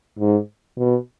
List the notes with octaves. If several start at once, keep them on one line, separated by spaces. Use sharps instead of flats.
G#2
B2